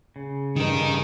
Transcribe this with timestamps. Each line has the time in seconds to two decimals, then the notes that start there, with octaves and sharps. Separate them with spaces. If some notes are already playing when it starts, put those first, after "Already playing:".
0.16 C#3
0.56 G2 D#3 D#4 A#4